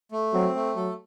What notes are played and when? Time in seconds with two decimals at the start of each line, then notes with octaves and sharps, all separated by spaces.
0.12 A3
0.34 F#3 C4
0.55 A3
0.76 F#3 A4